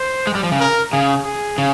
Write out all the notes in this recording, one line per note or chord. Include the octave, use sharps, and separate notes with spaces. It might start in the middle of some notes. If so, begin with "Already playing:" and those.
Already playing: C5
G#3
G3
F3
C#3
A#4
C#3 G#4
G#4
C#3